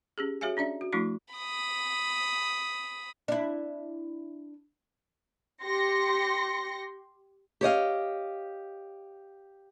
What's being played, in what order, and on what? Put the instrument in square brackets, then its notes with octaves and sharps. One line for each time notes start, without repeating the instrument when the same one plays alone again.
[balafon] C#4 G4 G#4
F#4 G#4 C#5 E5 F5 G#5
C#4 D4 D5 E5
F#4
F3 A3 D4 E4 F#4 C#6
[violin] B5 D#6
[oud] D4 E4
[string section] G4 C6 A#6 C#7
[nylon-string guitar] G4 C#5 D#5 F5